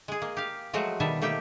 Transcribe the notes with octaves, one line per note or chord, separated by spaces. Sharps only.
G#3 G#4
A#3
G4 F5
F3 F#3 G#3 A3 F#4
B2 D#3 G3 E5 A5
D#3 A3 A#3 G4 G5